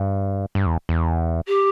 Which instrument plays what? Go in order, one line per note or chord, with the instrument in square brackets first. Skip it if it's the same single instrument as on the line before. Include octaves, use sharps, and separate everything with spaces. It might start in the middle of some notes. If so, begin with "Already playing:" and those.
Already playing: [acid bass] G2
G2
E2
E2
[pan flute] G4